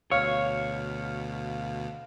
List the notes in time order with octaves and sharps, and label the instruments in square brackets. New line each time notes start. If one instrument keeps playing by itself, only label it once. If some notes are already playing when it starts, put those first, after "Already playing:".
[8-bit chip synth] D2 B2 [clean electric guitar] C#5 [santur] F5